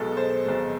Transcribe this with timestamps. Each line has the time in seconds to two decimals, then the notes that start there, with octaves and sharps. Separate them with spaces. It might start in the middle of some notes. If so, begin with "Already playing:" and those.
Already playing: B1 B2 G#3 A4
0.17 C5
0.45 B1 B2 G#3